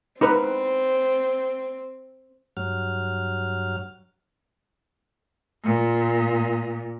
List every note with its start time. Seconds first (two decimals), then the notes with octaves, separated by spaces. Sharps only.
0.21 C4 D#4 A#4 B4
2.57 G2 F#3 F6
5.64 A#2